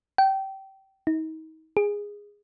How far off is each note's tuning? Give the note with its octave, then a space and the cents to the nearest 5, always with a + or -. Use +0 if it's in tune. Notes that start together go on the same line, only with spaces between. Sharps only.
G5 -20
D#4 +35
G#4 -15